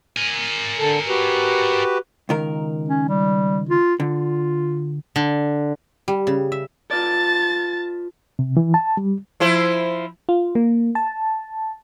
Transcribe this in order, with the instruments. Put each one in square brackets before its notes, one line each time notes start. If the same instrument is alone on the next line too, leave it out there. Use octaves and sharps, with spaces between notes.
[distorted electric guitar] A#4 G#5
[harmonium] D3 A4
F#4 G4 B4
[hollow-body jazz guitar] C#2 D#3 A#4
[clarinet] C#4
G3
F4
[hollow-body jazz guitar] D3 [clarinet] F4
[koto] D3
[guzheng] G3
C#3
E5
[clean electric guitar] F4 B4 D5 [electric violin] A5 A6
[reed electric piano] C3
E3
A5
G3
[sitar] F3 E4 C5
[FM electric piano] F4
A#3
A5